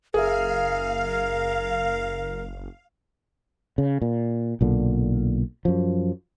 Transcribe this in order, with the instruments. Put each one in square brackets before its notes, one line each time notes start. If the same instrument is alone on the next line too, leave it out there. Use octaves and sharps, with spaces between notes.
[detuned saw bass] F#1 [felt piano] G#4 E5 [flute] A#4 [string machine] F5
[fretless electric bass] C#3
A#2
B1 A#2 D3
F#2 F3